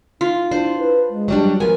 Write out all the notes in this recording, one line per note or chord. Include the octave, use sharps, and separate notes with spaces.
D#4 F4
D4 E4 C5
B4
G#3
F#3 G3 D4
F3 B3 A#4 G#5